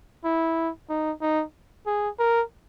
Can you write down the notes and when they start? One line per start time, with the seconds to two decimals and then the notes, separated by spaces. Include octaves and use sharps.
0.24 E4
0.89 D#4
1.21 D#4
1.87 G#4
2.19 A#4